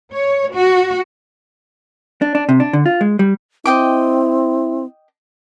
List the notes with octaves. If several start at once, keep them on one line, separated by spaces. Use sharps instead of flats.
C#5
F#4
D4
D4
C3
D4
D3
F4
G#3
G3
C4 E4 D#5 G5 D6